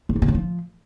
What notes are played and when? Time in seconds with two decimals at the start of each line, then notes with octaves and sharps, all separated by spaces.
0.09 F2
0.16 G#2
0.22 C3
0.28 A2
0.35 F3